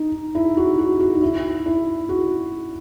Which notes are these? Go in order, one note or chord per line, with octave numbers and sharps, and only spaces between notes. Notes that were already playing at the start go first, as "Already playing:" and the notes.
Already playing: D#4
E4
F#4
F#4
F#4
D#4
E4
E4
F#4